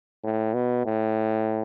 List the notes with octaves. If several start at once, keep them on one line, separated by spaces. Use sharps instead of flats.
A2
B2
A2